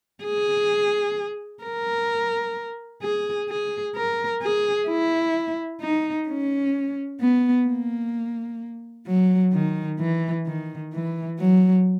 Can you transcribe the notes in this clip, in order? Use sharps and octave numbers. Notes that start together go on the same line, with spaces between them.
G#4
A#4
G#4
G#4
A#4
G#4
E4
D#4
C#4
B3
A#3
F#3
D#3
E3
D#3
E3
F#3